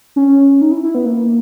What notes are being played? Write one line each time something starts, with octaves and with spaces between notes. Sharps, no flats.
C#4
D#4
E4
E4
B3
A#3